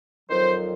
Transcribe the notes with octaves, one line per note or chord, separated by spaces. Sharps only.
F2 D#3 F#3 C5